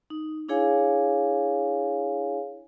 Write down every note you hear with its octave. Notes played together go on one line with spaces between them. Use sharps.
D#4
D4 E4 G#4 C#5 F5 G#5